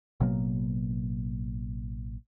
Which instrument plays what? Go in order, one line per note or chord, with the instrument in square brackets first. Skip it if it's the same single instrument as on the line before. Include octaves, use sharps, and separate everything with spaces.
[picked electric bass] A1 B2 F#3 A#3